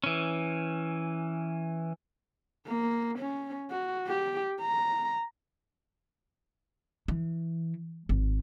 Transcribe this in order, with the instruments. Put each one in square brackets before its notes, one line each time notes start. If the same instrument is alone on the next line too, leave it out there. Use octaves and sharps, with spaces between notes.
[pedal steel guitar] E3 C#4
[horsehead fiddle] A#3
C#4
F#4
G4
A#5
[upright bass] E3
G#1